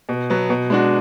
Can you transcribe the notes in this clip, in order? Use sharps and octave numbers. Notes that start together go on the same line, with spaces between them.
B2
F#3 B3
B2
G#3 D4 F#4